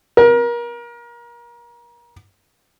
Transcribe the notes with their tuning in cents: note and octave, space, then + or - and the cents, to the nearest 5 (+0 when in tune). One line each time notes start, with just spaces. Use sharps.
A#4 +30